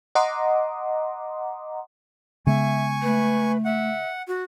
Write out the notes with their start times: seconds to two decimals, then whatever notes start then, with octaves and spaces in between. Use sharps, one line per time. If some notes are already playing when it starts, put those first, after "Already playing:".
0.15 D#5 F#5 A#5 C6 D6 D#6
2.47 C#3 G#3 B3 E5 G#5 C#6
3.02 A3 B4
3.65 E5 F#5
4.27 F#4